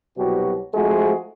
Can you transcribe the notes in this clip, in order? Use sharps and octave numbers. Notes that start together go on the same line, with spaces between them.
C2 B2 F#3 F#4 G4
F3 G#3 A3 C4 D#4 F#4